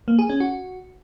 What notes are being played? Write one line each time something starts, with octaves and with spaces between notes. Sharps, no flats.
A#3
G#4
C#4
F#4